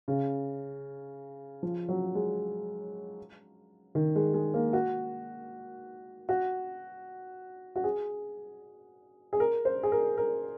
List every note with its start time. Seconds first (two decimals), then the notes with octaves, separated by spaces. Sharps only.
0.08 C#3
1.63 F3
1.89 F#3
2.15 G#3
3.95 D#3
4.16 G#3
4.34 G#3
4.54 A#3
4.73 F#4
6.29 F#4
7.76 F#4
7.84 G#4
9.33 G#4
9.40 A#4
9.65 C5
9.83 G#4
9.92 A#4
10.17 A#4